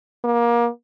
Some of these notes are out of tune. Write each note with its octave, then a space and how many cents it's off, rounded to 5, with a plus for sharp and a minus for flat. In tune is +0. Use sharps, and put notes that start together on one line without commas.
A#3 +25